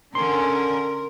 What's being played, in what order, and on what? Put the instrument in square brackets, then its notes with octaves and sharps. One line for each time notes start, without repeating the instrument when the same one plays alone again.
[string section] D3 C#4 [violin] A#4 [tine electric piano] C6